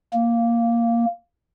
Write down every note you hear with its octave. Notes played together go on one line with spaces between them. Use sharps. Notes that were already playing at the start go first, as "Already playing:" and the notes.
A#3